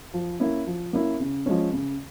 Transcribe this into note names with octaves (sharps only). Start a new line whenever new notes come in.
F3
A#3 C#4 E4
F3
A#3 C#4 E4
C#3
F3 G#3 C#4
C#3